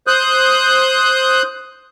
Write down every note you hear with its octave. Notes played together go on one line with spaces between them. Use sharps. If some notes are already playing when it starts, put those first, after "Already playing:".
C5 D#6 F#6 G6